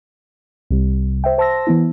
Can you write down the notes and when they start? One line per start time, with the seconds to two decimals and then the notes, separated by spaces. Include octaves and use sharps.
0.70 C2 C3 G3
1.24 C5 E5 G5
1.38 C5 A5 C6 E6 A#6
1.67 E3 B3 E4